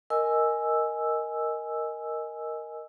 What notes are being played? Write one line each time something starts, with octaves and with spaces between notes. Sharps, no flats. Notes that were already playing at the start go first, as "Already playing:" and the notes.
A#4 D#5 G#5 E6